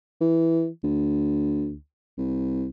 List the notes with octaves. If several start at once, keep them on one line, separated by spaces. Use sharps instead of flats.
E3
D2
C2